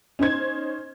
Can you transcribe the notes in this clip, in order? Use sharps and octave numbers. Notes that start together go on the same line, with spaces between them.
C#4 D#4 C5 G#6